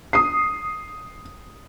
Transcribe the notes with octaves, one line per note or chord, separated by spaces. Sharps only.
D#6 C7